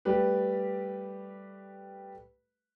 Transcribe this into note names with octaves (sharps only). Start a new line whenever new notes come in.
G3 A3 G4 B4